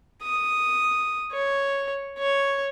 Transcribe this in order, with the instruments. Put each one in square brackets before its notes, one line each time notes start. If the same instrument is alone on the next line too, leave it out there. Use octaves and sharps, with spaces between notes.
[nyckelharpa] D#6
C#5
C#5